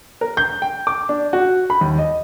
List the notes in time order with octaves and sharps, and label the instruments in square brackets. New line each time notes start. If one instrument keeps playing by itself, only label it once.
[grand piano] A#4
G6
G5
D6
D4
F#4
B5
D#2
D#5